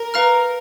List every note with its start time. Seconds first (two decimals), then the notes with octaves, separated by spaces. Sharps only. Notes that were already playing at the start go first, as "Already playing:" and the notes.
Already playing: A#4
0.14 B4 F5 A#5 F6